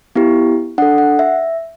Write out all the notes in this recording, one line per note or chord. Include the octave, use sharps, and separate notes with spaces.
B3 E4 G4
D4 A4 F#5
F#5
E5